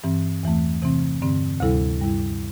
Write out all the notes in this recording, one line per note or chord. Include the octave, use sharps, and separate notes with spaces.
G2 E3 C4
E2 E3 A3
C3 E3 C4
G2 D3 C4
D2 C3 G3 E4 A4
G2 G3 E4